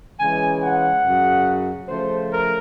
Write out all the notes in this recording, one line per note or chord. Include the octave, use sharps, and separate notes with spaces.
C#3 E3 G#3 G#5
F#5
F#2 C#3 F#3
C#3 F3 A3 C5
A#4